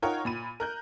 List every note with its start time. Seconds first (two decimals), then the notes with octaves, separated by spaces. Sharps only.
0.02 D#4 F4 A#4 C#5 F#5 G5
0.25 A#2 B5 D#7
0.60 A#4 F#6 G6